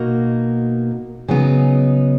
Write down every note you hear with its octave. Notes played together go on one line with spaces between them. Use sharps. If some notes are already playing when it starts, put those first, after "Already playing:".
Already playing: B2 A#3 D#4 F#4 A#4
C#3 F#3 B3 D#4